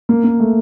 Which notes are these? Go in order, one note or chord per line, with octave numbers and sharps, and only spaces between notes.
A#3
A#3
A3